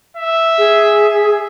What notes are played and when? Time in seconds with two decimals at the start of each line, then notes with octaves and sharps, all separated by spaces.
0.17 E5
0.58 G#4